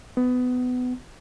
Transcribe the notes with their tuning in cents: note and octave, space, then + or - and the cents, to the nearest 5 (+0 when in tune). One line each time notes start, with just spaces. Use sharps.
B3 +20